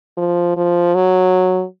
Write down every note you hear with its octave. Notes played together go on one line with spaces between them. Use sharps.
F3
F3
F#3